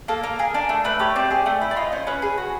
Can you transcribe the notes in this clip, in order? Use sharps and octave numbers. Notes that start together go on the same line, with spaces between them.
A#3 A4
A#3 A#4
G#4
D4
A3
A3 B4
G4 C#5
C4 D5
G#4
A3
E4
D5
F4 D#5
C#4 C5
C#4 B4
G#4
F#4